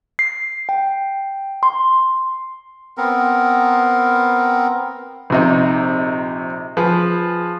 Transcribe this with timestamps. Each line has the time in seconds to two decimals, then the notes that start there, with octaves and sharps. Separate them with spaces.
0.19 C7
0.69 G5
1.63 C6
2.97 B3 C4 A#4
5.30 A#1 C3 D#4
6.77 F3 G#4 B4